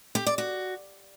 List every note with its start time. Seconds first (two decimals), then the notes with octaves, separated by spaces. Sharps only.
0.15 G4
0.27 D5
0.38 F#4